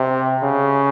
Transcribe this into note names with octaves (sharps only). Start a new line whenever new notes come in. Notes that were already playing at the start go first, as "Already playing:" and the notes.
Already playing: C3
C#3